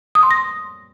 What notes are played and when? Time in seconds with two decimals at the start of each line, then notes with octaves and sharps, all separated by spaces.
0.15 D#6
0.23 C6
0.31 A#6